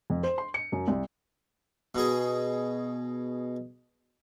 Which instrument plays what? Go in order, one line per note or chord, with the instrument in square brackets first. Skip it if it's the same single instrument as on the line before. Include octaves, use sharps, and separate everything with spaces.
[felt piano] F2
C5
C6
C#7
F#2
C2
[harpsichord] B2 G#4